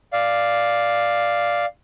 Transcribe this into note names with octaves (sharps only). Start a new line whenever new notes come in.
D5 F5